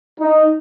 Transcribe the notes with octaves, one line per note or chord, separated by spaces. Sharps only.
D#4